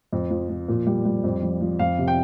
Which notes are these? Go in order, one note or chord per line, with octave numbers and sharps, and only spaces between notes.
F2
F3
F3
A#2
G3
G3
F2
F3
F3
F2 F5
C3
G5